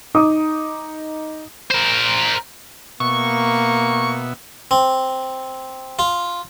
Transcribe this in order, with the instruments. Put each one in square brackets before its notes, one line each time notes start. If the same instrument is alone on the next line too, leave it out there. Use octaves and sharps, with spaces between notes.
[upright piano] D#4 D6 D#6
[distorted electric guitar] A#4 C5
[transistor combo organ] B2 B3 E5 [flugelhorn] A#3 [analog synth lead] C#6
[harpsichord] C4
F4